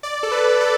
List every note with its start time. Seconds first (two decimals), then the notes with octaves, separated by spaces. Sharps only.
0.03 D5
0.23 A4
0.31 B4
0.61 A4